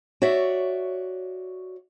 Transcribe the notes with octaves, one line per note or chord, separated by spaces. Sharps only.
F#4 C#5 D5 E5